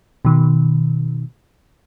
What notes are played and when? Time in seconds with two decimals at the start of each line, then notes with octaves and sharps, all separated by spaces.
0.25 B2 D#3